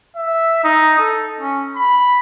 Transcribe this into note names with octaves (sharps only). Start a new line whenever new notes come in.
E5
D#4
A4
C#4
B5